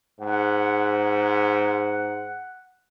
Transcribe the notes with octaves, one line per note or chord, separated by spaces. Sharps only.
G#2 F#5